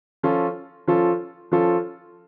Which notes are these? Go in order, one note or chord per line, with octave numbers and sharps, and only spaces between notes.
F3 C#4 F4 A4
F3 C#4 F4 A4
F3 C#4 F4 A4